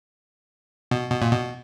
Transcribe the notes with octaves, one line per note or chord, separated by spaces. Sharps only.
B2
B2
A#2
B2